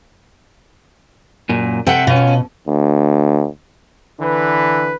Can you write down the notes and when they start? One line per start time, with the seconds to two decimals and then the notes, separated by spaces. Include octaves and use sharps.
1.49 F#2 A#2
1.87 C3 A4 E5 F#5 G5
2.07 B2 C#4 F4
2.68 D2
4.20 D3 E3 B4